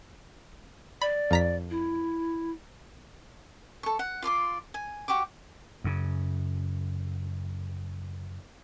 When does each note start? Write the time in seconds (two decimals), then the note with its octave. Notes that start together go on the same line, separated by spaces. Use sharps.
1.02 D5 B5
1.31 F2 A#5 B6
1.70 E4
3.83 A4 C#6
3.99 F#5
4.22 F4 D5 C6 D6
4.74 G#5
5.08 F#4 G4 C#6 D6
5.84 F#2 C#3